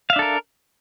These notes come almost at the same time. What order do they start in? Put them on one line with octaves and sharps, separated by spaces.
F5 E5 D4 A4 A#4